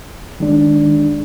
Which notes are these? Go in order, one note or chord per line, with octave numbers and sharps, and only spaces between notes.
D#3 G#3 D4